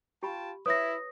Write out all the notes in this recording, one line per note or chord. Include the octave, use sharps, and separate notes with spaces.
F4 G4 G5 A5 B5
E4 B4 C#5 D#6 A#6